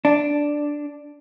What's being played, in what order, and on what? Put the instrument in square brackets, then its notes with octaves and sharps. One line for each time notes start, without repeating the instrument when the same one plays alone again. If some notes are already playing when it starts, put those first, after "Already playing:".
[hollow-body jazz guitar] D4